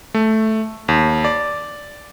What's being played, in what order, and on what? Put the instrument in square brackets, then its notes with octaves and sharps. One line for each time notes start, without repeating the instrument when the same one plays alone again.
[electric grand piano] A3
D#2
D5